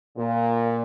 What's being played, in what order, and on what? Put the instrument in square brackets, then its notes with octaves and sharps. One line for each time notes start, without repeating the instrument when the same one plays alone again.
[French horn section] A#2